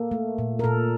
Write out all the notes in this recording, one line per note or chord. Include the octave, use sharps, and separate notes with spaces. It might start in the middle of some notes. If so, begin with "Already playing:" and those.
Already playing: A#3 A4
A3
A#2
A#4
A#2 A4